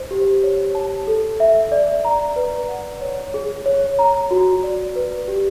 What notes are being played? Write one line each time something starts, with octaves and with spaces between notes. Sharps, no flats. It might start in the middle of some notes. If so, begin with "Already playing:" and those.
Already playing: C5
G4
C#5
A5
A4
E5
D5
A#5
B4
F#5
C#5
G#4
C#5
A#5
F#4
D5
B4
G4